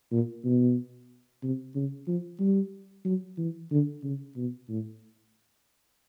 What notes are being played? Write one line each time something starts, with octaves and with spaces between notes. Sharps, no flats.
A#2
B2
C3
C#3
F3
G3
F#3
E3
D3
C#3
B2
A2